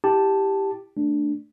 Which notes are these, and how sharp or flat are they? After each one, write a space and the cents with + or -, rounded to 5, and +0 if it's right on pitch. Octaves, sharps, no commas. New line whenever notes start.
E4 -10 G4 +0 A5 +0
A3 +0 D4 +0